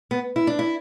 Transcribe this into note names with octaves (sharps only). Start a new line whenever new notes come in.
B3
E4
D4
E4